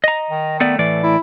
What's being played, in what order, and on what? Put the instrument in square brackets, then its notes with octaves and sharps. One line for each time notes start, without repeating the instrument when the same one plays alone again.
[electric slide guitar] D#5 A#5
[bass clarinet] D#3
[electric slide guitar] A3 B3 D5
[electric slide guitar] A2 E3 D5 [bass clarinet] A3
[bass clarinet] E4